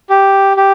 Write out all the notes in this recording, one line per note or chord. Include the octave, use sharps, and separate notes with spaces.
G4
G4